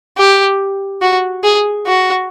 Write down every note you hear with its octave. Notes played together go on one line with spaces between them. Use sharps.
G4
F#4
G#4
F#4